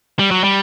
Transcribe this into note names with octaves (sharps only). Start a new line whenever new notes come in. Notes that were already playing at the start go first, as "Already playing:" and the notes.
G3
F#3
G3